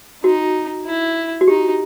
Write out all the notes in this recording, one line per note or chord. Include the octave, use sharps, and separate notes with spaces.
D#4 F#4
E4
F#4
D#4 G4